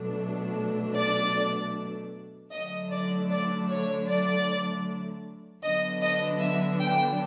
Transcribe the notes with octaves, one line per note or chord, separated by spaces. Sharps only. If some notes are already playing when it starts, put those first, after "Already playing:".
Already playing: B2 F#3 A3 D4
D5
D3 F#3 A3 D4 D#5
D5
D5
C#5
D5
D3 F#3 B3 D4 D#5
D#5
E5
G5